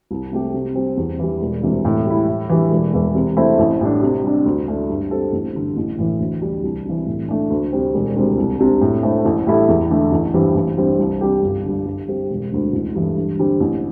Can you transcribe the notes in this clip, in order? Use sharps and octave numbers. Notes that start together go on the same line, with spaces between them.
C2
C3 A3 C4 G4
C3
G3 C4
E2
E3 G3
E1
D2 C3 E3
A2
G3 E4
A2
E3 G3
E1
E2 E3
C3
A3 C4 E4
A1
A2 G3 D4
C3
G3 D4
D2
D3 A3 D4
G2
G3 C4 A4
A1
G2 D3
A1
A2 E3
D2
D3 G3 D4
C2
C3 E3
A2
A3 D4
D2
C3 G3 C4
E1
D2 C3 G3
C2
C3 G3 D4
A2
A3 C4 E4
A1
A2 G3 E4 A4
E2
D3 A3
A1
G2 E3 C4 G4
A1
G2 G3 C4
C2
C3 G3 D4 G4
G1
G2 D3
G2
G3 C4 G4
E1
D2 D3
A1
G2 E3 A3
G2
D3 G3 C4
A1